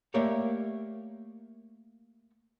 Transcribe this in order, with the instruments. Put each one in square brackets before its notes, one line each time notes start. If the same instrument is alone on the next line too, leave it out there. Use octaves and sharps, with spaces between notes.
[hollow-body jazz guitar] A3 A#3 G4 A#4 C#5 D5